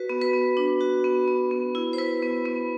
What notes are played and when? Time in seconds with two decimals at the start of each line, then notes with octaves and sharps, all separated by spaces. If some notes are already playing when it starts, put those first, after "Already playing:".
Already playing: F#4 B4
0.09 B3
0.21 B4
0.33 B3
0.57 D4
0.81 F#4
1.04 B3
1.28 B3
1.51 B3
1.75 E4
1.93 C5
1.98 E4 B4
2.22 B3
2.45 B3